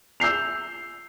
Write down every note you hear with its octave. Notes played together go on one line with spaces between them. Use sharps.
E6 G6 C7 F7